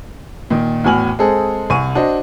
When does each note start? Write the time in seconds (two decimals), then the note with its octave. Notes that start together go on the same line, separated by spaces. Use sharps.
0.50 A#2 D#3
0.84 E2 A2 F#4 G#5 F6 F#7
1.19 G#3 C4 G#4 A4
1.70 C2 G#5 C#6 D#7
1.95 D4 F#4 C5 D#5